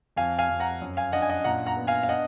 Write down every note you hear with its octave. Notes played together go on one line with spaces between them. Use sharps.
F2 F5 G#5
F5 G#5
F2
F#5 A#5
F#2
F5 G#5
D4 D#5 F#5
G#5
D#5 F#5
A#2 F#5 A#5
F#5 A#5
B3
F5 G#5
F5
D4 D#5 F#5